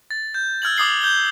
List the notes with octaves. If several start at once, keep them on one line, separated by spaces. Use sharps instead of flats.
A6
G6
E6 F6 G#6 F#7
D6 D#6 C7 F#7
G6 G7